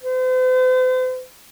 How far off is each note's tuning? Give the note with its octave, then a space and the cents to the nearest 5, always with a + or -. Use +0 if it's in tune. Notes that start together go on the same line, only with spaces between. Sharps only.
C5 -45